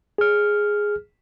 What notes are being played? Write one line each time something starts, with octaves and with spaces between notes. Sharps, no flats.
G#4 F6